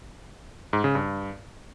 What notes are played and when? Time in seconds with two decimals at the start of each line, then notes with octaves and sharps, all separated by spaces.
0.73 G#2
0.84 C#3
0.95 G2